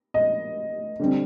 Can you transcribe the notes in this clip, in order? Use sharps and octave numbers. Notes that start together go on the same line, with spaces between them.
D#5
D3 G3 C4